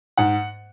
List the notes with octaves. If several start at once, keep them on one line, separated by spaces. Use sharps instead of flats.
G#2 F#5